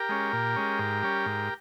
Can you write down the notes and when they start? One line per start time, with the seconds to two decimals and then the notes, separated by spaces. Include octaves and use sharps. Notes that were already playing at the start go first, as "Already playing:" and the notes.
Already playing: G4 A#4
0.09 G#3 C#4
0.33 A#2
0.56 G#3 C#4
0.79 G#2
1.02 G3 C#4
1.26 G#2